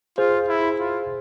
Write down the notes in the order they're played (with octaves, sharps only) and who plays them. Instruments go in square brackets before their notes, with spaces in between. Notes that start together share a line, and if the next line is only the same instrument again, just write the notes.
[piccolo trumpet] F4 [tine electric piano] G#4 C5
[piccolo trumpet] E4
F4